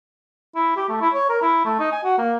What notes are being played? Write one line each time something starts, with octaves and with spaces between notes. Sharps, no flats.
E4
G4
A3
E4
C#5
A#4
E4
A3
D#4
G#5
F#4
A#3